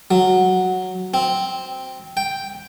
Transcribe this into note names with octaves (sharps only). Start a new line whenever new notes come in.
F#3
C4
G5